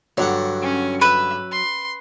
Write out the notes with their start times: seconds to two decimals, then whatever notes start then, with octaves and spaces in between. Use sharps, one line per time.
0.17 G2 D3 F#3 F#5
0.62 C#4
1.01 B4 E5
1.52 C6